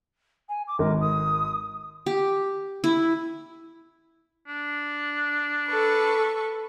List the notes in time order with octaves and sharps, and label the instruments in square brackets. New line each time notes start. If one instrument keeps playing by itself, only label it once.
[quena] G#5
D6
[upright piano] G#1 [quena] A#4
[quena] D#6
[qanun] G4
E4
[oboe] D4
[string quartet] A4 B4 C#6